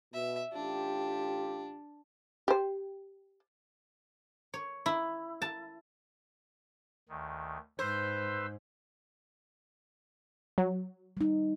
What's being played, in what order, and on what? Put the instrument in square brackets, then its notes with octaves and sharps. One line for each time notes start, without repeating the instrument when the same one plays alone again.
[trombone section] B2 [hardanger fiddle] E5
[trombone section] A1 F4 G4 [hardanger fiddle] D4
[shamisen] G4 C5
[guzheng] C#5
E4
A5
[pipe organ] D2 D#3
[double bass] G#2 [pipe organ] B4 C6 E6 [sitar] C5 [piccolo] G6
[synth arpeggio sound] F#3
[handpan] G3 D#4